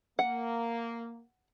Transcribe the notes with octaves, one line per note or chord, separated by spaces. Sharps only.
A#3 F#5